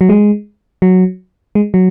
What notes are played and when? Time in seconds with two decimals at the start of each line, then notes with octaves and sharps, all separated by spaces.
0.01 F#3
0.09 G#3
0.82 F#3
1.55 G#3
1.74 F#3